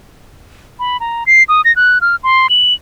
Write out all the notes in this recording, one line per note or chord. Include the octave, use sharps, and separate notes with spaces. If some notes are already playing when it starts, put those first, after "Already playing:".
B5
A#5
C7
D#6
A#6
F#6
F6
C6
F#7